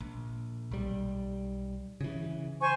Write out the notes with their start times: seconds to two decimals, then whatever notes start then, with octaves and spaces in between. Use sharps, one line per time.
0.01 A#1
0.71 B1 G3
2.01 C#3 E3
2.60 C5 G#5 C#6